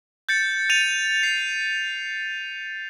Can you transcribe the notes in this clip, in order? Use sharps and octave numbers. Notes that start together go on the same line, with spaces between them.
G6 A6 C#7
A6 D#7 F7
C7